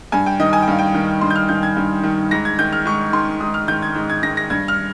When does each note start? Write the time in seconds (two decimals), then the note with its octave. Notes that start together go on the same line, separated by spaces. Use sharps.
0.12 G2 G#5
0.26 G5
0.39 D#3 D#5
0.53 G#5
0.62 G5
0.68 G2 F5
0.79 G5
0.94 D#3
1.21 G2 C6
1.30 G6
1.36 F6
1.49 D#3 G6
1.63 G#6
1.77 G2
2.03 D#3
2.31 G#2 A#6
2.45 G#6
2.59 D#3 G6
2.73 F6
2.85 G#2 C#6
3.13 D#3 C6
3.40 G#2 D#6
3.54 F6
3.68 D#3 G6
3.82 G#6
3.95 G#2
4.10 G#6
4.23 D#3 A#6
4.37 A#6
4.50 G2 G#6
4.68 F6